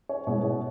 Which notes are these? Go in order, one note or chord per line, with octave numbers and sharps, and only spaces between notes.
C#5
B2 G#3 B3 E4 C#5
C#5